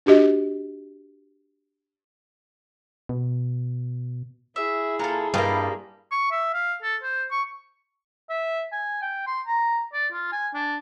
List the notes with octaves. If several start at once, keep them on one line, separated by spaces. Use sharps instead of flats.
D4 F#4 G4 D#5
B2
E4 G#4 E5
A#2 A4 F5 A#5
G2 G3 A#3 F4 B4 D#5
C#6
E5
F5
A4
C5
C#6
E5
G#5
G5
C6
A#5
D5
F4
G#5
D4